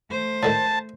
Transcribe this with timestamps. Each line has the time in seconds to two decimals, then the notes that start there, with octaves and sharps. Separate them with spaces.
0.10 A3 C5
0.43 A2 D3 D#3 A5